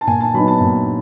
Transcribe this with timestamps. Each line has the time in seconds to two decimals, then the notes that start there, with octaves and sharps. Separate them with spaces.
0.01 A5
0.07 A#2 G#5
0.20 A5
0.34 F#3 B3 D#4 B5
0.48 A5
0.60 A#2